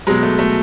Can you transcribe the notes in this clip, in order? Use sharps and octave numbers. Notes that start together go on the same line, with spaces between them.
B2 F#3 G#3
A3
A3